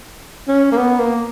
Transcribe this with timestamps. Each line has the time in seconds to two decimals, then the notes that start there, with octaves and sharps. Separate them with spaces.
0.48 C#4
0.72 A#3
0.77 B3
0.99 A#3